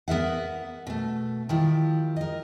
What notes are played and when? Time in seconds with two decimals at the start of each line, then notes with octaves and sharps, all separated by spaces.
0.08 B3 A#4 E5 F#5
0.87 B2 A3
1.49 D#3 F3 E4 G4
2.16 A#4 D#5